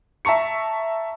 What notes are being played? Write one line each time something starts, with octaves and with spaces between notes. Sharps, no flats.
E5 A5 A#5 C#6 C#7